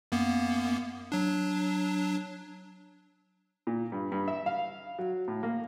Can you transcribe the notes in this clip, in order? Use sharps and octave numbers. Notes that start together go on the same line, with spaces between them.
F#2 A#3 B3
F#3 D4
A#2
G2
G2
E5
F5
F#3
A2
A#3